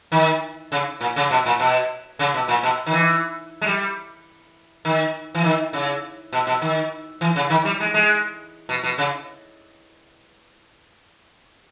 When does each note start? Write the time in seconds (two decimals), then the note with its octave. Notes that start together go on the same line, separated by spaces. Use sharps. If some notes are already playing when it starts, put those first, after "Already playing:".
0.12 D#3
0.72 C#3
1.01 A#2
1.16 C#3
1.30 B2
1.46 A#2
1.59 B2
2.19 C#3
2.34 B2
2.48 A#2
2.63 B2
2.86 D#3
2.93 E3
3.61 G#3
3.66 G3
4.85 D#3
5.35 E3
5.44 D#3
5.73 C#3
6.33 B2
6.47 B2
6.62 D#3
7.21 E3
7.36 C#3
7.50 D#3
7.65 G3
7.80 G#3
7.94 G#3
8.69 B2
8.84 B2
8.98 C#3